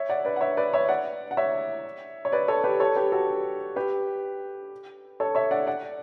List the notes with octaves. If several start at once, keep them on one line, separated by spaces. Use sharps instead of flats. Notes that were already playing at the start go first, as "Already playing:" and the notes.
Already playing: C#5 E5
D5 F#5
B4 D5
F#5
C#5 E5
B4 D5
C#5 E5
D5 F#5
F#5
C#5 E5
C#5
B4 D5
A4 C#5
G4 B4
A4 C#5
G4 B4
F#4 A4
G4 B4
A4 C#5
C#5 E5
D5 F#5
D5 F#5